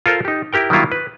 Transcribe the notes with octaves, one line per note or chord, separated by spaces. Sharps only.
F4 A4 A#4 C5
D#4 G4
E4 G4 A#4 G5
D#3 F#3 G3 A#3 E4 F4
B4